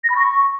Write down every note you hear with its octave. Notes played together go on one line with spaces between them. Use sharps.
A#6
B5
C#6